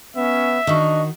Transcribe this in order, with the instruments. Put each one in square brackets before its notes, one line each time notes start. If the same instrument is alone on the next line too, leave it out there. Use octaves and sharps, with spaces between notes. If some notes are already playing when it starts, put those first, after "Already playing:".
[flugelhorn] B3 [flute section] C#4 [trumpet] E5
[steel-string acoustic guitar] D#3 F#4 [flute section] D4 C#6 [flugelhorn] D#5